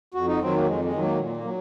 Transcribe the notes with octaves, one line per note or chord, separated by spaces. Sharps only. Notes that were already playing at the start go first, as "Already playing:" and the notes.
F2 F#4
D#4
D#3 F#3 C4
A#3
F2 G#3
G#3
D#3 F#3
A#3
A#2
A#3
F#3